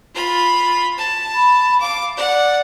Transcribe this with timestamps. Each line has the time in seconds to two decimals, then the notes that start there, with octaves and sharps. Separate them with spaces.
0.14 F4 B5
0.98 A5
1.34 B5
1.81 F5 D6
2.17 D5 F#5